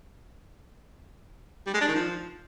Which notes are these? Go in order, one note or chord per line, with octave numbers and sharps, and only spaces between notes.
G3
G#3
D4
D#3
F3